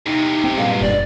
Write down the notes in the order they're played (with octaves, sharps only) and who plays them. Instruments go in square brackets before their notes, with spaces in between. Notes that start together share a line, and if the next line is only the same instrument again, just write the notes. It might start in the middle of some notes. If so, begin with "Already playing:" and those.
[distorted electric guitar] E2 C3 [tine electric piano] D#4
[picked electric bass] C4
[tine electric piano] G2 A#2 G#3 [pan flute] F5
[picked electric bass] F#1 [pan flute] D5